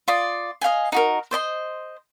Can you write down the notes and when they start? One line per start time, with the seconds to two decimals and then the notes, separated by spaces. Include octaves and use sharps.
0.08 F4 D5 D#6
0.61 D#5 F5 G5 G#5
0.92 D#4 F#4 A#4
1.31 C5 D5 D#5 C6